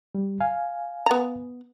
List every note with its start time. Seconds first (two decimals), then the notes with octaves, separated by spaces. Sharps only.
0.15 G3
0.40 F5 G#5
1.06 B3 A#5